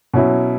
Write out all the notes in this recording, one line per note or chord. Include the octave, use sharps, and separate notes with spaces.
B2 F#3 C#4 E4